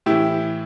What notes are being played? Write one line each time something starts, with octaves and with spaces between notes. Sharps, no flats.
A2 E3 E4 G4